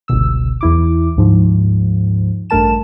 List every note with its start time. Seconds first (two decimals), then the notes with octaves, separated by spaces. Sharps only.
0.08 G1 C#2 B2 E6
0.61 E2 E4 D6
1.16 D2 G#2 F3
2.50 A1 G2 A3 A#4 A5 E7